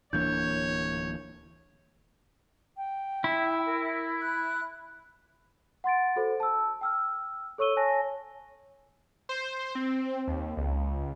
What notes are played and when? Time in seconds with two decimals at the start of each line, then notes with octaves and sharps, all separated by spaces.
0.13 D1 E3 A#3 D4 C#5 G6
2.77 G5
3.24 E4
3.65 A#4
4.23 B5 F#6
5.84 F#5 C6 A6 D7
6.16 F#4 A4 C5
6.40 A5 E6
6.81 G5 E6 F6
7.58 A4 C#5 C#6 E6 D#7 G7
7.77 C#5 G#5 A5 A#6
9.29 C5
9.75 C4
10.28 D#2
10.57 C#2